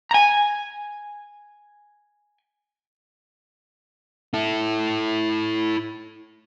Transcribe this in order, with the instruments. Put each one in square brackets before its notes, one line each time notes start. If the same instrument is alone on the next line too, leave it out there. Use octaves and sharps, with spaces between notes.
[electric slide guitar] G#5 A#5
[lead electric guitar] E4 A4